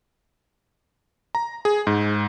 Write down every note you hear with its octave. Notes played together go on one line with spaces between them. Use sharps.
A#5
G#4
G#2